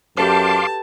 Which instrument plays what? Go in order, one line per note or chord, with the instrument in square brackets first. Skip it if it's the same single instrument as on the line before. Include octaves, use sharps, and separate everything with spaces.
[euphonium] F#2 [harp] G4 A4 B4 [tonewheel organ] F5 C6 D6 [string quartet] A5